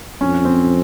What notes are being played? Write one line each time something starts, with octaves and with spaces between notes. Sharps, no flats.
F2 C#4
C4